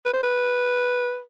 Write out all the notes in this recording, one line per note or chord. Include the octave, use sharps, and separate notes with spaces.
B4
C5
B4